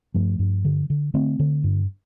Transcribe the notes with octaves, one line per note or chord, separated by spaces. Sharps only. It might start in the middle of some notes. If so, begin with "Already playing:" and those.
G2 F3 A3
G2
D3
D3
D3 A3 C4
D3
G2